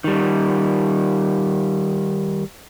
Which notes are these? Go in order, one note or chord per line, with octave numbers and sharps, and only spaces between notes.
D#3 G3